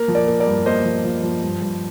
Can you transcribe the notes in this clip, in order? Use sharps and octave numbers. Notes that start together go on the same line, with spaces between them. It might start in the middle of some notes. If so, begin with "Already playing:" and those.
Already playing: A#3 A#4
F3
A#4 D5
A#3
A#4 D5
G2
A#3 C5 D#5
F3
F3
F3
G2
G2